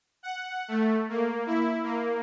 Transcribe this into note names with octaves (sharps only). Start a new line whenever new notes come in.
F#5
A3
A#3
E4
A#3